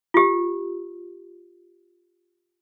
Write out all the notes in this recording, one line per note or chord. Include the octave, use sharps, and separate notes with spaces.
F4 G4